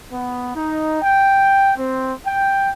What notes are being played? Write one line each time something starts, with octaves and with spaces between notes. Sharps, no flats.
B3
D#4
G5
C4
G5